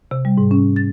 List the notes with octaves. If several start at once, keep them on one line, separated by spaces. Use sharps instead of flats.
C3
G3
G#2
C#4
A6